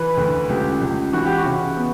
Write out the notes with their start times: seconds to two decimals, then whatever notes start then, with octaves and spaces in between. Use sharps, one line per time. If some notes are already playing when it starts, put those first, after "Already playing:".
Already playing: E3 B4
0.17 D2
0.49 C#2 G4
0.81 C#2
1.13 E3 F#4
1.25 G4
1.38 F#4
1.45 C#3
1.77 B3